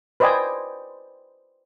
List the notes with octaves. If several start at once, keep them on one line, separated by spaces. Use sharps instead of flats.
B4 C5 D5 D#5 G5 G#5